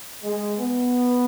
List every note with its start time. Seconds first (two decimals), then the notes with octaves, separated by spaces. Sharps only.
0.23 G#3
0.58 B3